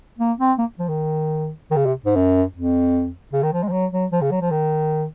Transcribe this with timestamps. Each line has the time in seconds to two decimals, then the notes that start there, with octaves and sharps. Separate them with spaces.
0.19 A#3
0.39 C4
0.58 A#3
0.79 F3
0.88 D#3
1.71 D#3
1.76 C#3
1.86 C3
2.05 G#2
2.16 F#2
2.55 F2
3.33 C#3
3.43 D#3
3.53 F3
3.63 G#3
3.68 F3
3.72 F#3
3.92 F#3
4.12 F3
4.21 C#3
4.32 F#3
4.41 F3
4.51 D#3